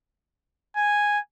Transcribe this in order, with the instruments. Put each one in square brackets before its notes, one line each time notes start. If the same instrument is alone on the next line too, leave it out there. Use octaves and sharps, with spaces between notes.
[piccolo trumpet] G#5